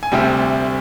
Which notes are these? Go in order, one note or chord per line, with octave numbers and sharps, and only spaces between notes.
G#5
D2 C3 G3 G5